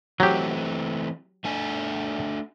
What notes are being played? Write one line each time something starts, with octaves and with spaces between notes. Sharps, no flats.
E3 F#3 A3 C4 G4
A3 D4 G#5